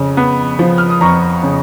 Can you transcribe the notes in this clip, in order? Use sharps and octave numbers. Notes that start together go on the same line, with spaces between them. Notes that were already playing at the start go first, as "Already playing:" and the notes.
Already playing: F2 C#3
B3
F3
F6
D#6
F2 A#5 C#6
C#3